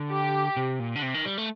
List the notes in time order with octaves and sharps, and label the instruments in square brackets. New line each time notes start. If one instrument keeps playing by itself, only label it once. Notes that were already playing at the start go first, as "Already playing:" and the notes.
Already playing: [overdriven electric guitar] D3
[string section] G4
[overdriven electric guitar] C3
A#2
D3
C3
D#3
G3
A3